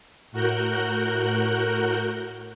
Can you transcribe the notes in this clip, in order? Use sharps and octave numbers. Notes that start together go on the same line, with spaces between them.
A2 F#4 A#4 F#6 G6